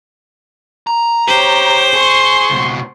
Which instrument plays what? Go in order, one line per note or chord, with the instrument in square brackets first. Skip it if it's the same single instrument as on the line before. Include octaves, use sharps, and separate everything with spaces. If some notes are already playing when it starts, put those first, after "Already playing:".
[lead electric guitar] A#5
[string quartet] G4 C#5 [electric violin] C5
[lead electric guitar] G#4 [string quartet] C6 C#6
[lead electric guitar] C#2 B2